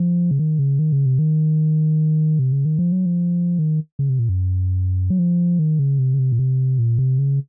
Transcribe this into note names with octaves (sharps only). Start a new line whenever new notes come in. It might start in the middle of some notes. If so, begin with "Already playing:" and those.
Already playing: F3
C#3
D#3
C#3
D#3
C#3
C3
D#3
C3
C#3
D#3
F3
F#3
F3
D#3
C#3
C3
A#2
F#2
F#3
F3
D#3
C#3
C3
C#3
C3
A#2
C3
A#2
C3
C#3